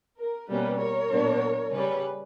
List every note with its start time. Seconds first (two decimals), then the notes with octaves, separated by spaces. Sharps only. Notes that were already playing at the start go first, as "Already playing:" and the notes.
0.18 A#4
0.49 B2 G3 A#3 C#4 B4
0.80 A#4 C#5
1.11 A#2 F#3 B3 D4
1.72 C#3 G3 C#4 B4